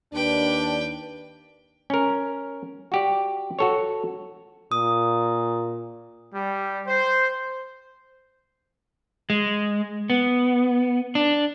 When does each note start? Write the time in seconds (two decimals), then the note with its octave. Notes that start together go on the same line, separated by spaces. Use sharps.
0.13 D#2 D4 B4 G5
1.90 C#4 A#4
2.92 F#4 G4 D5
3.59 F#4 A4 C#5
4.72 A#2 D#6
6.35 G3
6.87 C5
9.30 G#3
10.10 B3
11.15 D4